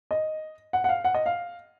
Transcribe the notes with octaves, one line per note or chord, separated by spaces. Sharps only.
D#5
F#5
F#5
F5
F#5
D#5
F5